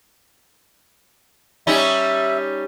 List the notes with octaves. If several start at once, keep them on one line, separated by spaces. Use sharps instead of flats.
G3 C#4 D#4 E5